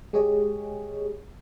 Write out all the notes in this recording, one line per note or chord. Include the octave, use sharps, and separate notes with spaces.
G#3 G4 G#4 C#5 D#5